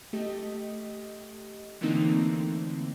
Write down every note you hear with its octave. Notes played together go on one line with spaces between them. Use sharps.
A3 G4 D#5
D3 E3 A3 A#3 C4 D#4